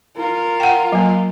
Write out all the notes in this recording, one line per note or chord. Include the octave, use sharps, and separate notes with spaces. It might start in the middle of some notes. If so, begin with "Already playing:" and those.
F4 A#4
F#5 G5
F#3 A#3